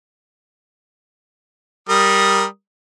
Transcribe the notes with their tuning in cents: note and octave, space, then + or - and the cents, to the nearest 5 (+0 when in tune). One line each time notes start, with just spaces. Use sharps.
G3 +0 A#4 +0 D#6 +0